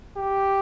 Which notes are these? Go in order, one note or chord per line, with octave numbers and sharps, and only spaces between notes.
G4